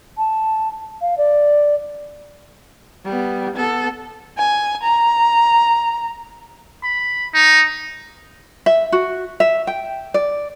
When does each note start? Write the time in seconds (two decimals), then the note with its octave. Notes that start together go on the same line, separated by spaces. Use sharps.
0.18 A5
1.01 F5
1.18 D5
3.05 G3 B3
3.55 B3 A4
4.38 G#5
4.83 A#5
6.84 B5
7.34 D#4
8.66 E5
8.92 F#4
9.40 E5
9.67 G5
10.14 D5